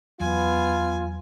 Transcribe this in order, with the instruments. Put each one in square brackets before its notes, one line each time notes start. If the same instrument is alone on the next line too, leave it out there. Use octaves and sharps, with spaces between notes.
[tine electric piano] E2 F#3 [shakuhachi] B3 [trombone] F4 [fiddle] G#5